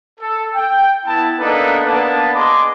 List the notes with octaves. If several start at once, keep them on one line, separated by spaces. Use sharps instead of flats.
A4
G5
B3 E4 A5
A#3 B3 D4 D#4 A4 B4
A#3 B3 D4 B4 A5
G#4 D#5 C6 D6